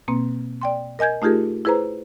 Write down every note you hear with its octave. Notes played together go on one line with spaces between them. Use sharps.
B2 A#3 C4
D5 G5 C6
A#4 D#5 G#5 G6 G#6
A3 D#4 F4 G4 G#4 A#4
E4 G#4 B4 C5 A#5